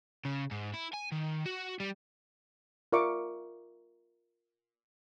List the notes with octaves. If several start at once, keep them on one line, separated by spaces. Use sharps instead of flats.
C#3
G#2
E4
G#5
D#3
F#4
G3
F4 A#4 D5 E5 C#6 D6